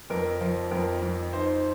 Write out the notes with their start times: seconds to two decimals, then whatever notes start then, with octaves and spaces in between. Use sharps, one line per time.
0.10 F2 A#4
0.41 F3
0.71 F2 A#4
1.02 F2
1.33 D#4 C5